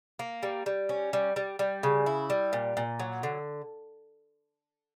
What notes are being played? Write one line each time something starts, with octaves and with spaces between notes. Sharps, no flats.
A#3
G3
G3
C#4
G3
G3
G3
C#3
E4
G3
A#2
A#2
F#3
D3